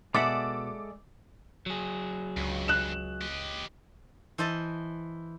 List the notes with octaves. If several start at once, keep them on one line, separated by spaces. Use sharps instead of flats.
B2 G#3 A4 D5 E5 F#5 D6
F#3 G#4
C#2 G2 C#3
F#6 E7
G4 D#5
E3 C5 D#5 A5